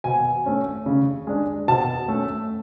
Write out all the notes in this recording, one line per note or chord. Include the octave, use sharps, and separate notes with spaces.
B2 G#5
A3 C#4
C#3
G#3 D4
B2 A5
A3 C#4